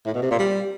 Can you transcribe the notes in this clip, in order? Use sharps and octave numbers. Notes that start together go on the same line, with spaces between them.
A2
B2
C3
A#2
G3